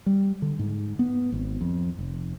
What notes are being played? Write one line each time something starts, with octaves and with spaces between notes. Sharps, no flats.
G3
D3
G#2
B3
G#1
F2
F1